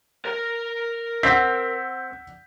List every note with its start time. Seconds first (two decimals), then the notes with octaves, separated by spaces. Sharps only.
0.25 A#4 A#5
1.23 C4 F#5 E6 G6 B6